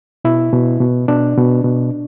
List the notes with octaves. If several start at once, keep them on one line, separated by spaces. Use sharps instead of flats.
B2 E4
B2
B2
B2 D4
B2
B2